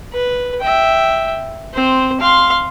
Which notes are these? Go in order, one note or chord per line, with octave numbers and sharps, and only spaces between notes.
B4
E5 G5
C4 C5
F5 C6